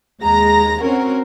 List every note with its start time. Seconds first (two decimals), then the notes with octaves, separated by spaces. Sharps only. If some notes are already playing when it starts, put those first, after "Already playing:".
0.22 D#2 G#3 A#5 A#6
0.82 C4 C#4 F#4 A#4